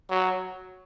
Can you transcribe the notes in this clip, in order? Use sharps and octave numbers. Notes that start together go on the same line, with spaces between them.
F#3